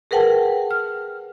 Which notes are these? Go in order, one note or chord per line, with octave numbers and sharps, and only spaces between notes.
G#4 A#4 B4 F#5 G5 A5
F6